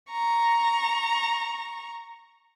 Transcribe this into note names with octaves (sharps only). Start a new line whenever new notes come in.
A#5 C#6